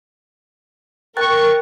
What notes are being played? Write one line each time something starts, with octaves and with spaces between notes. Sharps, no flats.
A#4 G5 C#6 F#6 A6